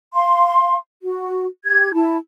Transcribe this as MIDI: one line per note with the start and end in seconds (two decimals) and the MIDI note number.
0.13 0.75 77
0.13 0.75 84
1.02 1.45 66
1.65 1.92 67
1.65 1.92 92
1.94 2.16 64
1.94 2.16 81